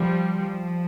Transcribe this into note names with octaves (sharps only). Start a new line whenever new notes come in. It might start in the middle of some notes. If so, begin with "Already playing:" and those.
Already playing: F3 G3
F3